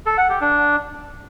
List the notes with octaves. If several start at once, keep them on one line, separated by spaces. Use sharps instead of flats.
A4
F#5
G4
D4